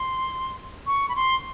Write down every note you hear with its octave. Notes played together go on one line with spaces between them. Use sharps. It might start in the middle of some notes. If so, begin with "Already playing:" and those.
Already playing: C6
C#6
B5
C6